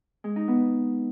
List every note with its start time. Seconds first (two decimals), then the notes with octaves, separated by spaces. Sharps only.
0.24 G#3
0.36 D#4
0.48 B3